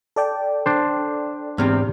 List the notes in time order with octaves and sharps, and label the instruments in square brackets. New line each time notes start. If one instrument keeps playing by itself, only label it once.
[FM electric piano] A4 D5 G5
[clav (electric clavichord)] D4 C5
[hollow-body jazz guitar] E2 C3 C4 [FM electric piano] G#2 F6